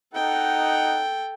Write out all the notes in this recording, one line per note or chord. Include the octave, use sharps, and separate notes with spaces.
D#4 A4 F#5 G5